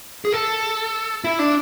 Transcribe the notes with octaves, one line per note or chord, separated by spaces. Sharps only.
G#4
A4
E4
D4